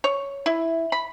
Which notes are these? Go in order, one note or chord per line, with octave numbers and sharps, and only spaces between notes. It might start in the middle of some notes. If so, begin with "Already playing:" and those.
C#5
E4
B5